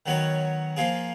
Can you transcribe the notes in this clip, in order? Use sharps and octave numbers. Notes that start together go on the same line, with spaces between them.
D#3 F#3 B3 F#4 C#5
F3 A#3 F4 G#4